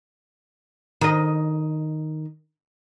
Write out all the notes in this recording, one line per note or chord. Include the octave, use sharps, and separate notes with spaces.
D#3 D#5